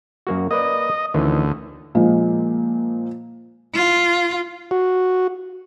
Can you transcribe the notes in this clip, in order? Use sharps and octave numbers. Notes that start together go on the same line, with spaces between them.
F#2 A#3 F#4
A#3 B4 D5 D#5
D2 D#3 E3 C#4
A#2 F3 G#3
F4
F#4